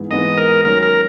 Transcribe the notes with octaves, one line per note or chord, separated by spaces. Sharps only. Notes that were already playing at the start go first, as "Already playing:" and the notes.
Already playing: G#2 E3 G#3 B3
G#2 E3 G#3 B3 D#5
A#4
D#3 F#3 C#4 A#4
A#4